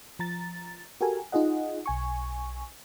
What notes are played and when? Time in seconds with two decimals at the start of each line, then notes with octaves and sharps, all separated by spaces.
0.19 F3 A#5 A6
1.01 F#4 G4 A4 A#4 G#5
1.32 D#4 F4 G#4 D#5 F#5
1.86 B1 G#5 C#6